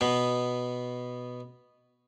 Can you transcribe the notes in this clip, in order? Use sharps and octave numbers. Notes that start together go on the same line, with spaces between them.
B2 B3